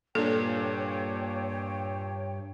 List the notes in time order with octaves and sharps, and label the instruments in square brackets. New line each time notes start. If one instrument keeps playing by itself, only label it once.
[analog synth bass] G2 [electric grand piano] A#2 D4 [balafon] A4 [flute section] C#5 G5